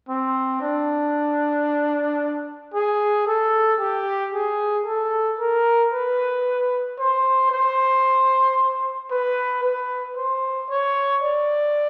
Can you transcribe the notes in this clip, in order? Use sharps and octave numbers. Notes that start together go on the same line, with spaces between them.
C4
D4
G#4
A4
G4
G#4
A4
A#4
B4
C5
C5
B4
B4
C5
C#5
D5